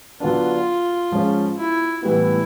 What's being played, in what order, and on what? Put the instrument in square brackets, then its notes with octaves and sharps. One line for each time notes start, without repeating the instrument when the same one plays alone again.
[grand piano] D3 F#3 B3 D4 [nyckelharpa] F4
[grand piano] G#2 F3 G#3 C#4
[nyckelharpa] E4
[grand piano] A2 E3 G3 B3 [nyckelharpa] E4